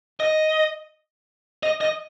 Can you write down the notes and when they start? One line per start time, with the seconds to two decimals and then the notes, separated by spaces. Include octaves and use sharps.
0.20 D#5
1.63 D#5
1.81 D#5